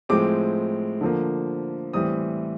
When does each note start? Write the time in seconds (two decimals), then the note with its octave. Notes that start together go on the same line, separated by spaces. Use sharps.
0.09 A2 F3 G#3 C4 D6
1.01 D3 F3 A#3
1.93 A2 E3 G3 C4 D#6